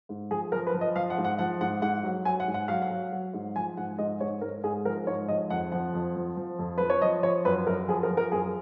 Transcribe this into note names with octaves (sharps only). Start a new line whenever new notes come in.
G#2
F3 G#4
F3 A#4
B4
F3
D#5
F3 F5
F#5
G#2
F#5
F3 F#5
G#2 F#5
G#2 F#5
F#3
F#3 G#5
F#5
G#2
F#5
F#3 F5
F#5
F#3
F#3
G#2
F3 G#5
G#2 F#5
G#2 D#5
G#2 C#5
G#2 A#4
G#2 G#4
F3 A#4
G#2 C#5
F3 D#5
F2 F#5
F3 F#5
F2
F3
F3
F2
F3 B4
C#5
F3 D#5
F3 C#5
F#2 B4
F#2 A#4
F3 G#4
A#4
F3
A#4
F#2 G#4